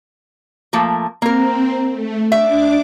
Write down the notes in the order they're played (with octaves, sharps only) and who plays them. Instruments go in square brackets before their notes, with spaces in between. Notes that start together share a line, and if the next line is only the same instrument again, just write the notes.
[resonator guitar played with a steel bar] F3 A3 A#3
[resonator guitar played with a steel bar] A#3 A#4 [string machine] C4
[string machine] A3
[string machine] D4 D6 [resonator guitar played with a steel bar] E5